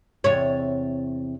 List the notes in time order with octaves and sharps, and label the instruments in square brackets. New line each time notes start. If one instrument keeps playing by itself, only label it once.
[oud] E2 C3 C#5